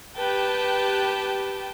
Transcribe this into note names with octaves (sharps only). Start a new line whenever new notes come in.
G4 B4 G5 A5